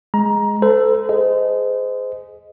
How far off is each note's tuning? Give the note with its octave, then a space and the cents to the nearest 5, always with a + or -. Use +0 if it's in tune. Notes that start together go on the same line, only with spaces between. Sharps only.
G#3 +0 A#5 +20
A4 +5 C5 -40
G#4 +15 C5 -30 D#5 +0